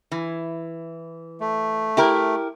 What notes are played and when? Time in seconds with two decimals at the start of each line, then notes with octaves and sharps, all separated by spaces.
0.11 E3
1.41 A3
1.97 E4 G4 A#4